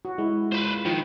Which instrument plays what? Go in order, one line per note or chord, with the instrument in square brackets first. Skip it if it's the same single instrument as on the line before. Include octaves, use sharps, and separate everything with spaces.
[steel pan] F#4
[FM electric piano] G#3 [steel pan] E4
[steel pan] F4 [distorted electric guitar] B4 C5
[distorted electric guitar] D#3 [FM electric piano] F3